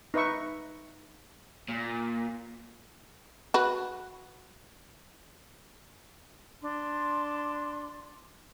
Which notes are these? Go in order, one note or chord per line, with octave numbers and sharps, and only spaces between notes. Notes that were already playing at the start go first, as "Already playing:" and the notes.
D#4 B4 E5 C#6
A#2
F#4 B4
D4 C6